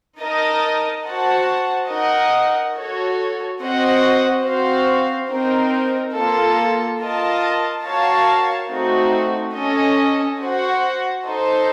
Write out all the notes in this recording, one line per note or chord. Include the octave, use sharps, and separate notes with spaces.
D#4 A#4 D#5 A5
F#4 C5 F#5 A5
D#4 A#4 D#5 F#5
F#4 A4 C#5
C4 F#4 C5 D#5 F#5
C4 F#4 C5 F5
C4 D#4 A#4
A#3 F4 A4
F4 A#4 D#5 A5
F#4 A#4 C#5 F5 A5
A3 C4 D#4 F#4
C#4 A4 D#5
F#4 C5 F#5
D#4 A4 C5